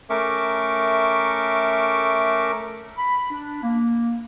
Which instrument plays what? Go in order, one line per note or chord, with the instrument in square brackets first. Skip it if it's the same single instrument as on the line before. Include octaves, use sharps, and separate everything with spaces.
[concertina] A3 C#4 A#4 E5 C#6 D6
[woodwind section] B5
D4
A#3